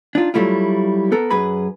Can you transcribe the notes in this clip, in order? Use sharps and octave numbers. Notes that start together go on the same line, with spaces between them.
D4 D#4 F4
F#3 G3 A3 E4 F4
B3 A4 A#4
F#2 G#4 B4 B5